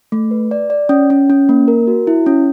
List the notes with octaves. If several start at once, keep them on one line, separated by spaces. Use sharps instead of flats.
A3
B4
D5
D5
C#4
C#4
C#4
A#3
A#4
F#4
E4
C#4